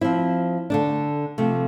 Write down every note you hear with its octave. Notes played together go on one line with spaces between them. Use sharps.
F3 C4 E4
D3 A3 D4
C3 F3 A3